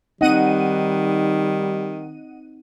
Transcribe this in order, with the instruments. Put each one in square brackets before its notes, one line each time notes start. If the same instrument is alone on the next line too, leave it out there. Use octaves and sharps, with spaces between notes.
[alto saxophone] D#3 [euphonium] G3 [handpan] C4 D#4 [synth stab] D#5 F#5 D#7